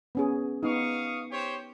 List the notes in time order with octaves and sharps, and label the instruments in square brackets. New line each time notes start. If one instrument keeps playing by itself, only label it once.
[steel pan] B3 C#4 G#4
[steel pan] B3 D#4 [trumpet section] F5 C#6 D#6
[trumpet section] G4 C5 C#5